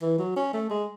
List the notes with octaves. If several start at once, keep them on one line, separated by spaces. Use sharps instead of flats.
E3
F#3
C#4
A3
G#3